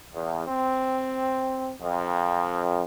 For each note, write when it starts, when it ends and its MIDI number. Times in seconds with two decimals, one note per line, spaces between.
0.14 0.47 40
0.48 1.71 60
1.82 2.84 41